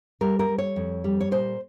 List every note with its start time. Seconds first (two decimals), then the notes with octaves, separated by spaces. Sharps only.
0.21 G3 A#4
0.39 A#4
0.49 G3
0.58 C#5
0.76 F2
1.04 G3
1.21 C#5
1.31 A#2 C5